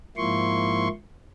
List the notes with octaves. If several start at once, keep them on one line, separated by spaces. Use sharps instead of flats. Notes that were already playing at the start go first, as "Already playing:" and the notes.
G#2 F3 A#3 E4 C6 C#6